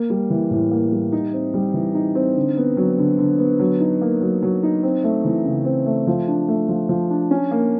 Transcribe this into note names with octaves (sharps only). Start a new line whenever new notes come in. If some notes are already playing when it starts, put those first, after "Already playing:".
Already playing: A#3
G3
E3
A2
A#3
G3
D#4
C4
G3
E3
D#4
C4
D3
B3
F#3
D3
D3
B3
F#3
D#4
A#3
F#3
F#3
D#4
C4
A3
E3
C#3
C4
A3
F3
D4
A3
F3
F3
D4
C#4
A#3